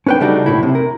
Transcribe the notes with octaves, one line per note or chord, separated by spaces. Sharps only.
C#4 D4 B4 C5 G5
C#3 G3 A3 D4 D#4 F#4
B1 A2 E4
C3
A#4